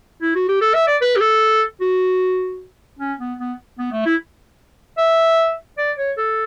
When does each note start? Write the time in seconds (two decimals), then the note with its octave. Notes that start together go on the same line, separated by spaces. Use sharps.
0.22 E4
0.35 F#4
0.49 G4
0.62 A4
0.74 E5
0.87 D5
1.01 B4
1.16 G4
1.21 A4
1.81 F#4
2.99 C#4
3.20 B3
3.39 B3
3.79 B3
3.92 A3
4.06 E4
4.98 E5
5.78 D5
5.98 C#5
6.17 A4